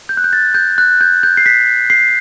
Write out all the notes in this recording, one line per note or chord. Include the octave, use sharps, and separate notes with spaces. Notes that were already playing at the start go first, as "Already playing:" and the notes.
G6
F#6
G6
A6
G6
F#6
G6
G6
C7
B6
C7